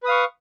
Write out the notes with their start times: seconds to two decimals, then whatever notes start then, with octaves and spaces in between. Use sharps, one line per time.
0.03 B4
0.05 D#6
0.08 F5
0.11 C#6